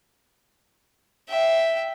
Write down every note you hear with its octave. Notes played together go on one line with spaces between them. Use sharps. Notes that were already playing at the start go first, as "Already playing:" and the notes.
E5 G5